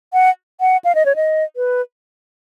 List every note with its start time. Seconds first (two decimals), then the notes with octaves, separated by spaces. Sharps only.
0.13 F#5
0.60 F#5
0.84 F5
0.95 D#5
1.06 C#5
1.16 D#5
1.56 B4